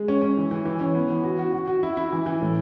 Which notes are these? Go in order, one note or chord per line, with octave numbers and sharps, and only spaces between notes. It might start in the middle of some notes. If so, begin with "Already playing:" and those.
Already playing: G#3
C#4
C#4
E3
E3
E3
C#4
B3
E3
F#4
F#4
F#4
F#4
E4
E4
E3
E3
A2